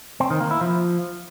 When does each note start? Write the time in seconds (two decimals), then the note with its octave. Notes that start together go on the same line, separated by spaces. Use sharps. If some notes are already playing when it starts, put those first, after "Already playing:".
0.20 C4
0.30 D#3
0.41 A#3
0.51 E4
0.61 F3